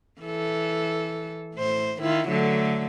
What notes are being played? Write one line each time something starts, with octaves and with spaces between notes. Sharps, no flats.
E3 A4
A2 C5
D#3 E4 F4
D3 F#3 A3